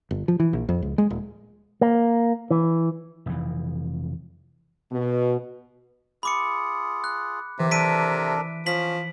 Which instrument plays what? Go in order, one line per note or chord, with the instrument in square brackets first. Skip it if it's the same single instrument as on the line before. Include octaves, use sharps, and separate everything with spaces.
[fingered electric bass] G1
F3
E3
A#1
F2
C#2
G#3
D#1
[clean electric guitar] A#3
E3
[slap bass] F1 F2 E3
[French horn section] B2
[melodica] F4 G#4 [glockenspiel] B5 D6 C#7
[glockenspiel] F#6
[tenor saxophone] C3 [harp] E3 [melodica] G4
[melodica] D4 A4 A#4 [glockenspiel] B6 D7 D#7
[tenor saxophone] F3 [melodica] C#4 [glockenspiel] B6 F#7